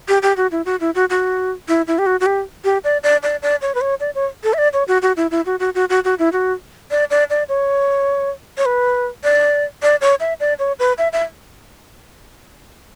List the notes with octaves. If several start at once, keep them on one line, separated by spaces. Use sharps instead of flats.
G4
G4
F#4
E4
F#4
E4
F#4
F#4
E4
E4
G4
F#4
F#4
G4
G4
D5
D5
D5
D5
C#5
B4
C#5
D5
C#5
A4
E5
D5
C#5
F#4
F#4
E4
E4
F#4
F#4
F#4
F#4
F#4
E4
F#4
D5
D5
D5
C#5
C#5
B4
D5
D5
C#5
E5
D5
C#5
B4
E5
E5